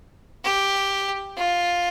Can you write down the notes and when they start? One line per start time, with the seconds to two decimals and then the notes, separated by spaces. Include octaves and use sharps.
0.44 G4
1.37 F4